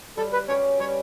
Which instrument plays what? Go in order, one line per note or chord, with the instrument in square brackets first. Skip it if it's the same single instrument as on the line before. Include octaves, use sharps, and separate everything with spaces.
[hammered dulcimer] G3 [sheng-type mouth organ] A4
[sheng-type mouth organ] B4
[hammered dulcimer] C#4 G4 B4 [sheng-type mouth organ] C#5
[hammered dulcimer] G3 [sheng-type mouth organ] C#5